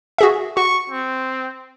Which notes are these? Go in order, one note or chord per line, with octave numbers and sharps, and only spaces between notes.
F#4 G#4 E5
F#4 C#6
C4